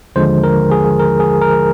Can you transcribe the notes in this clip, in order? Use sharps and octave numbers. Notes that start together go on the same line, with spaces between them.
D#2 D3 F3 G#3 C5
A#4
G#4
A#4
G#4
A#4